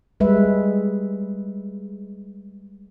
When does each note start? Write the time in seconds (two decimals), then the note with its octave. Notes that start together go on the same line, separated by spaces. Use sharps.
0.20 G3 G#3 B4 E5